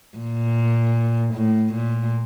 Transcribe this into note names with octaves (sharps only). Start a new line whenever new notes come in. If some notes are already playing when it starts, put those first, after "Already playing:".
A#2
A2
A#2